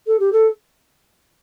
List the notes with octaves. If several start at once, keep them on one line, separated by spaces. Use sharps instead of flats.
A4
G4
A4